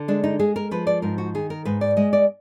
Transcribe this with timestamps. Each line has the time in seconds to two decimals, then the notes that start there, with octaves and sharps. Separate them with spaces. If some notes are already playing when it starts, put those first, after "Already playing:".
Already playing: D3
0.08 G#3 D4
0.24 D#4
0.39 G#3 G#4
0.56 A#4
0.71 F3 B4
0.87 D5
1.02 G#2 A#4
1.18 F#4
1.35 D#3 G#4
1.50 A#4
1.65 G#2 B4
1.81 D5
1.97 G#3 D#5
2.13 D5